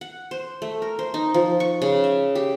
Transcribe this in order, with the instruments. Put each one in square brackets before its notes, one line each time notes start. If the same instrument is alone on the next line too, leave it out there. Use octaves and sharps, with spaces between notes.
[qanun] F#5
C5
A3
A#4
C5
D#4
F3
C#6
C#3
E5
G4